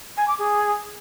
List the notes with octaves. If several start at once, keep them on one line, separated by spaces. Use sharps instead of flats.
G#5
D6
G#4